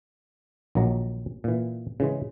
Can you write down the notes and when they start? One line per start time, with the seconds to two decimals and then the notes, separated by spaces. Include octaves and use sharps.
0.75 A#1 D#3 F#3 A#5
1.44 A#2 E3
2.00 C#3 E3 G#3